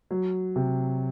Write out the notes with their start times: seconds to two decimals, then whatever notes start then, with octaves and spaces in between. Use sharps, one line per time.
0.11 F#3
0.56 C3